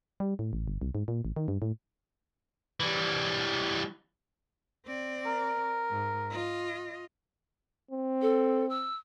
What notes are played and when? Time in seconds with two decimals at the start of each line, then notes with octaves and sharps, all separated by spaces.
0.20 G3
0.39 A2
0.53 A1
0.68 G1
0.82 C2
0.95 G#2
1.08 A#2
1.25 A1
1.36 D#3
1.48 G2
1.62 A2
2.80 E3 G3
4.86 C4 D5
5.26 A#4
5.90 G#2
6.30 F4 D#5
7.91 C4
8.21 A4
8.69 E6